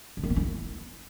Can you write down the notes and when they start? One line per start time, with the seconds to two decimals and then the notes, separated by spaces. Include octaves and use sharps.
0.17 D3
0.24 D#3
0.30 B3
0.36 E4